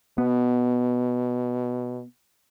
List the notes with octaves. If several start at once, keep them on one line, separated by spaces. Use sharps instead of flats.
B2 B3